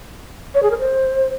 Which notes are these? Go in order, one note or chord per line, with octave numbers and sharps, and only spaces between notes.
C#5
G#4
A#4
C5